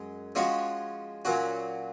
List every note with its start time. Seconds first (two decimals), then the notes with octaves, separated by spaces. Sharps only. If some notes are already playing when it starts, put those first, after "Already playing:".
Already playing: F#2 G#3
0.35 F3 G#3 C#4 F#4 C#5
1.25 A#2 F#3 C#4 F#4